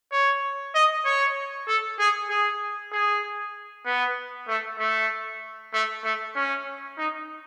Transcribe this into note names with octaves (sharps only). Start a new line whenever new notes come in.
C#5
D#5
C#5
A4
G#4
G#4
G#4
B3
A3
A3
A3
A3
C#4
D#4